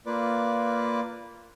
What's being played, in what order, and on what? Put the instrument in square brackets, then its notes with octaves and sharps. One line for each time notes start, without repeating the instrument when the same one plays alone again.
[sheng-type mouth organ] A#3 F4 B4 D5 D6